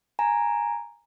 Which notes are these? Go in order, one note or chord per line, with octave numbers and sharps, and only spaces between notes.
G#5 A#5